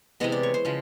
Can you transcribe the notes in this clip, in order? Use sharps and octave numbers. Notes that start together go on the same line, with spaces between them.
C3 E3 G#3 B3 D#5
D5
C#5
C5
C#3 F3 G#3